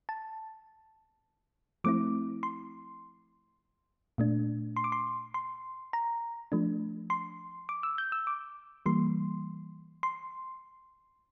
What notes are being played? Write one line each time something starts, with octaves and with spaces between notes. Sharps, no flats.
A5
F3 A3 C4 E4 D6
C6
A#2 A3 D4
C6
D6
C6
C6
A#5
F3 A3 D4
C6
D6
E6
G6
E6
D6
E3 G3 A#3 C6
C6